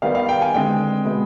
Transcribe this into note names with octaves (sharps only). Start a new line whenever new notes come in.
D#3 G3 B3 F5
F5
G5
G#5
D3 G#3 C4 G5
B2 G#3 B3